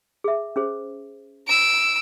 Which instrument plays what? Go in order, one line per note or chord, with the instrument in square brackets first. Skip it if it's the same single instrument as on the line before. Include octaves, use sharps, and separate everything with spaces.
[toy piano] G#4 E5
C#4 G#4 C5
[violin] E6 D7